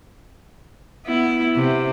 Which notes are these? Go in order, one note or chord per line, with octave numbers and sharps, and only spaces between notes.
B3 E4
C3